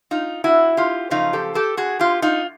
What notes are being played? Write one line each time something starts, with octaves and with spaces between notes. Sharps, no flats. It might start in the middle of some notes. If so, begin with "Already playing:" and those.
D#4 F4
E4 F#4
F4 G4
F#2 C#3 F3 A3 D#4 F4
G4 A4
G4 A4
F#4 G#4
F4 G4
D#4 F4